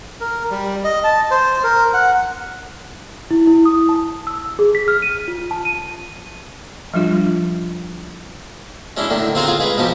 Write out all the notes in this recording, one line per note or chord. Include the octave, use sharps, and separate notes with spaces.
A#4
G3
D#5
A5
C5
A#4
F#5
E4
E4
D#6
A5
E6
G#4
B6
F6
D#7
F4
A5
D#7
F3 G3 D4 F4
G#3 C#4 D4 E4
A2 D3 D#3
C4 F4 G#4 C5 F#5 A#5
F4 G#4
G#3 G#4 B4
B2 F3 D#4 G4